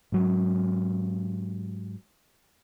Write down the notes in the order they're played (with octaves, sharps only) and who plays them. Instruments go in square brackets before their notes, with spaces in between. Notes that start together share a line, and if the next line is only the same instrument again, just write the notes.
[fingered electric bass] G#2 F#3 C#4